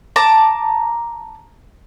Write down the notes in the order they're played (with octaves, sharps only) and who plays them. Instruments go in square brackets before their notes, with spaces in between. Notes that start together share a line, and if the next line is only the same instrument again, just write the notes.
[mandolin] A5 A#5 D6